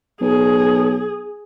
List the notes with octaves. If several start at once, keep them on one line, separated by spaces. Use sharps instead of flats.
B1 G#4